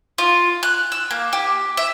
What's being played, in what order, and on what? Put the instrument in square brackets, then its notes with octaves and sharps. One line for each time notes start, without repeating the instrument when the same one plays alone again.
[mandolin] F4
F#6
E6
A#3
G4
E5